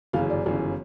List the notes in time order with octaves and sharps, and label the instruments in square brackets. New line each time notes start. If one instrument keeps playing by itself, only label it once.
[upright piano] G1 F#2 C#3 E3 F5
D5
G1 F#2 C#3 E3